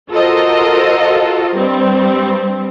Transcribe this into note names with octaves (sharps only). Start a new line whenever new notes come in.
F4 F#4 A4 A#4 C5 D#5
G2 G3 C4